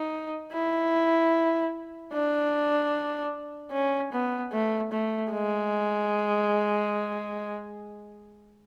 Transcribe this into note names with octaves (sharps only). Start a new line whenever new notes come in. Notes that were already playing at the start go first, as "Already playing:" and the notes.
Already playing: D#4
E4
D4
C#4
B3
A3
A3
G#3